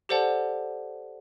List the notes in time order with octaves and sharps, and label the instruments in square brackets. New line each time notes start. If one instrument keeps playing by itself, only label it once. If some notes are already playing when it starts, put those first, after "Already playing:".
[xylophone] G4 A4 C5 D5 F#5 A5